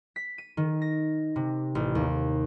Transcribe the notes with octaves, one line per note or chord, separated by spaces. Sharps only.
B6
D#7
D#3
A#6
C3
A1
D#2